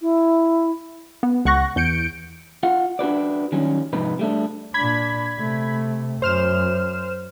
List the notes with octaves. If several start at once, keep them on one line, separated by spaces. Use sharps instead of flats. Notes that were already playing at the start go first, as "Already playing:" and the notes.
E4
B3
C#2 F#5 C#6 F#6 A#6
E2 G6 C#7 D7
F4 F5 F#5
D4 F#4 B4 D5
D#3 F#3 G3 C#4
F2 G#2 C3 D#4 B4
G3 A3 D4
A#2 D4 B5 G#6 B6
C3 A3
F#2 C5 F6 E7